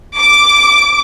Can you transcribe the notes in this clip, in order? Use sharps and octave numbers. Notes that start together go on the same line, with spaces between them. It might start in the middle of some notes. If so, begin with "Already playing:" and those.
D6